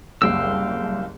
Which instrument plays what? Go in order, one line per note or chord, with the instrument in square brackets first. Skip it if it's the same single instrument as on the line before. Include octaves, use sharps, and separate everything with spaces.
[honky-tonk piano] F#1 C2 [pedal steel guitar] F5 G5 E6